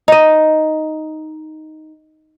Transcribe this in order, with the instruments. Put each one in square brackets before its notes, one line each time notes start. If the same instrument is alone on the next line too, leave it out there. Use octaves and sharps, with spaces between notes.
[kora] D#4 D#5